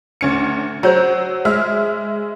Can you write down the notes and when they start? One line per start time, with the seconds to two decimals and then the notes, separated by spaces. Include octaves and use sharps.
0.21 D2 C#4 C#7
0.83 F#3 C5 C#5 A#5
1.45 G#3 E5 F6